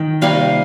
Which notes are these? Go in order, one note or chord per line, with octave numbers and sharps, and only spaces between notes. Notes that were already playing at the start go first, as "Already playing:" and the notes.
Already playing: D#3 G5
C3 G3 A#3 F5